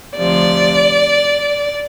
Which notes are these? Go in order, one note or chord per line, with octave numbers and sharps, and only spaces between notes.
D2 C3 F3 D5